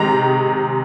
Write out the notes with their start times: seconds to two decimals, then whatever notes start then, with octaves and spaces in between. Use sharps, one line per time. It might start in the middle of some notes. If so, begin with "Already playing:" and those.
Already playing: C3 D#3 G#3 A#5